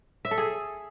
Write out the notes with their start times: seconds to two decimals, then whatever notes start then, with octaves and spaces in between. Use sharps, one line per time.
0.25 E5
0.31 A4
0.38 G#4